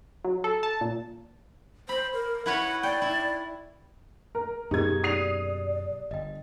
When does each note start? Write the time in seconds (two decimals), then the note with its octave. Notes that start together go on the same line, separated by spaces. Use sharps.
0.24 F#3
0.44 A4
0.63 A5
0.81 A#2
1.89 C5 B5
2.14 A#4
2.46 E4 B4 C#5 F#5
2.83 D5 G5
3.02 E4
4.35 A#4
4.71 F#2 B2 A#3 D#4 G4 G#4 B4 G#6
5.04 D5 D#6 C7 F7
6.11 G1 D#5 G5